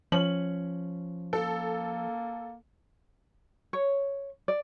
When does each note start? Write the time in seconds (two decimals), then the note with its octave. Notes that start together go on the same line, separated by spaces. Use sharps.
0.12 F3 C#4 F#7
1.33 A#3 A4
3.73 C#5
4.48 D5